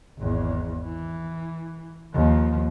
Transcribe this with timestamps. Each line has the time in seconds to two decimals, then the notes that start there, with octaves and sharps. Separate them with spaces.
0.19 G#1 E2
0.84 E3
2.14 D#2 F3